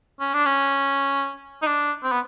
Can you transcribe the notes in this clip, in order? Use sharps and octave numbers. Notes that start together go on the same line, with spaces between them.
C#4
D4
C#4
D#4
D4
C4
B3